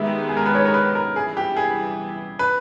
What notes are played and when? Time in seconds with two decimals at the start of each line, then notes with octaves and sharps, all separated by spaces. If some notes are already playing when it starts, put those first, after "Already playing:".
Already playing: D#3 G#3 B3 G4 E5
0.28 G#4
0.37 A#4
0.46 B4
0.55 C#5
0.66 A#4
0.74 B4
0.95 A#4
1.16 E3 G3 B3 E4 G#4
1.37 G4
1.56 G#4
2.39 B4